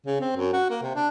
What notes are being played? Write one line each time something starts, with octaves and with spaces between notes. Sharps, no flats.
C#3
C4
F#2
F#4
A#3
C3
D4